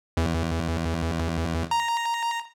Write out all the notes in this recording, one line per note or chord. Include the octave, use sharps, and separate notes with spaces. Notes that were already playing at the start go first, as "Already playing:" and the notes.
E2
A#5